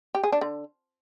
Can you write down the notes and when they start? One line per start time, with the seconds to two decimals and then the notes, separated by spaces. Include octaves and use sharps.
0.15 G4
0.23 G#4
0.32 D4
0.41 D3